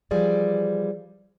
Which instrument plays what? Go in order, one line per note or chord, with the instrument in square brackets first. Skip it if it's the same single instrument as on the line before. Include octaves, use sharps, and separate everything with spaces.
[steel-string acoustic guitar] E3 F3 G3 G#4 D5